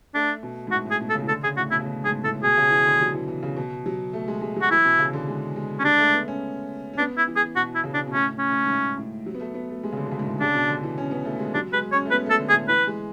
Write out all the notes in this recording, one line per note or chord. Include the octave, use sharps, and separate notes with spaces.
A3 D4
B2
G#2
A2 F#4
A2 G#4
B2
A4
C#3
E3
D3 A4
C#3 G#4
A2 F#4
B2 E4
C#3
B2
G#2 G#4
A2 A4
B2 G#4
C#3
E3
D3
F#3
E3
E3
C#3
B2
F#3
A3
G#3
G#3
F#3
F#4
E3 E4
B2
C#3
D3
G#3
G#3
C#4
G#3 D4
A3
B3
C#4
C#4
B3 D4
E4
E3
G#4
B2 F#4
E4
C#3
D4
B2
A2 C#4
C#4
A2
G#2
A2
A2
F#3
B3
A3
B3
A3
G#3
C#3
D3
B2
C#3
G#2
A2
C#3 D4
B2
D3
E3
C#4
B3
A3
G#3
F#3 D4
G#3 B4
C#4 C#5
A3
B3 B4
A3 A4
D3
G#4
A2
E3 B4
G#3